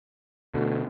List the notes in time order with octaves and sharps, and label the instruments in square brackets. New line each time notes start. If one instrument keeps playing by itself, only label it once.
[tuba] D2 [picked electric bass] B2 D3